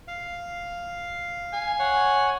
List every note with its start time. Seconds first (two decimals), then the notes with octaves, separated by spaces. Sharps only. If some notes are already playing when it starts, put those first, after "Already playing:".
0.08 F5
1.53 G#5
1.79 C#5 F#5